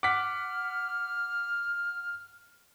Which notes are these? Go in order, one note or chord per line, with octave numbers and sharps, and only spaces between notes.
F#5 D6 F6 B6